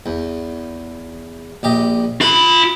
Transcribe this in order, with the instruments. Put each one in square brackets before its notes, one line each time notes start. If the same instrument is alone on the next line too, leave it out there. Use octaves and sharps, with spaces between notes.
[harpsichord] E2
A#1 G4 D#5
[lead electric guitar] F4 B5 [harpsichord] B4